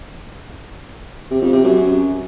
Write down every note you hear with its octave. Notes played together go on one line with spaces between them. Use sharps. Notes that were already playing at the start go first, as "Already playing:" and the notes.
C3
F2
C3
F#2